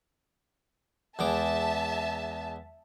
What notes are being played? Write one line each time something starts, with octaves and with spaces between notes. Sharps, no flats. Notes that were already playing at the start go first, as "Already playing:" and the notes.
E2 G#3 E5 A5 D6